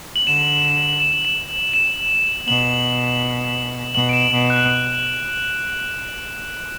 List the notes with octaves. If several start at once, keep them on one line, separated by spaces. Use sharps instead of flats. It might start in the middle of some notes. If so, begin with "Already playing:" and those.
F#7
D3 E7
F#7
E7
E7
E7
B2 F#7
B2 F#7
D7
E7
B2 D7
F#6